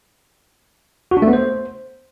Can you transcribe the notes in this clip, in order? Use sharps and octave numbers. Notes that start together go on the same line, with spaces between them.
F#4
D4
A3
B3
C5